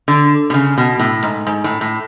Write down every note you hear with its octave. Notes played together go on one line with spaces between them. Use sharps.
D3
B2
C#3
B2
A2
G#2
G#2
A2
A2